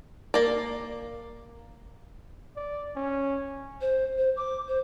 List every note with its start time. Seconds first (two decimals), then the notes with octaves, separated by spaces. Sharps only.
0.34 A#3 D5
2.56 D5
2.96 C#4
3.80 C5
4.17 C5
4.36 D6
4.68 C5